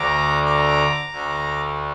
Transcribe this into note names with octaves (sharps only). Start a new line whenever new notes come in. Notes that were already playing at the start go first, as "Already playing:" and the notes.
Already playing: D2 D3 A#5 D6
A#5 D6
D2 D3